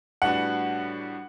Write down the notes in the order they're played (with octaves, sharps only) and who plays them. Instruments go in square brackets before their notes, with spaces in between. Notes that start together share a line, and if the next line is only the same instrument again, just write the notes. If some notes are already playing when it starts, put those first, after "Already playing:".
[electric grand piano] A2 G3 D4 F#4 B4 [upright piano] F#5